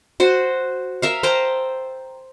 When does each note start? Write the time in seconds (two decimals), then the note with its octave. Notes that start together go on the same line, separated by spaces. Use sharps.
0.20 F#4 C5
1.02 A#4 E5 F5
1.23 C5 G5 A5 A#5